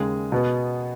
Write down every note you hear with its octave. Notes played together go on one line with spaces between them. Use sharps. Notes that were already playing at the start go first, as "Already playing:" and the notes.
Already playing: D#2 C#3 G#3 G#4
B2 B3